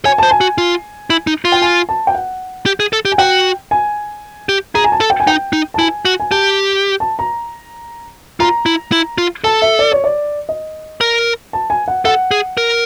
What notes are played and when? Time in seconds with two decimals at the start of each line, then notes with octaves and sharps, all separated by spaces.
0.05 C#5 G#5
0.18 C5 A5
0.31 G#5
0.41 F#4
0.58 F4
1.10 E4
1.27 D#4
1.45 F4
1.52 G5
1.62 G#5
1.89 A5
2.07 G5
2.15 F#5
2.66 G4
2.80 G#4
2.93 A4
3.05 G4
3.12 G#5
3.18 F#4 G5
3.71 G#5
4.49 G4
4.75 G#4 A#5
4.84 G#5
4.92 A5
5.01 A4
5.10 G5
5.20 G#5
5.27 D#4 G5
5.53 D#4
5.74 A5
5.79 E4 G#5
6.05 F#4
6.20 G#5
6.31 G4 A5
7.00 A5
7.19 A#5
8.40 F4 A#5
8.66 E4
8.92 E4
9.18 F4
9.44 A4 A5
9.62 E5
9.79 D5
9.92 C#5
10.04 D5
10.49 D#5
11.01 A#4
11.53 A5
11.70 G#5
11.88 F#5
12.05 A4 F#5
12.31 G#4
12.57 A#4